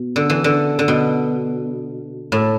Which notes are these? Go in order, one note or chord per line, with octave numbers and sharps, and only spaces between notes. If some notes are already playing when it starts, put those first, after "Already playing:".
Already playing: B2
D3
E3
D3
D3
B2
A2